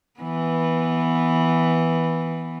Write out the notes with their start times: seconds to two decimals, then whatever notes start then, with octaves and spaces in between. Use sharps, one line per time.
0.20 E3 B3